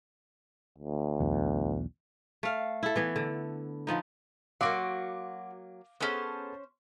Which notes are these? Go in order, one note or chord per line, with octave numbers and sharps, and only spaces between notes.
D2
B1 E2
A3 F5
E4 A4
E3 B3
D3
F3 B3 D#4
F#3 A#3 F#4 F5 C6 D6 D7
B3 C#4 G#4 A4 C5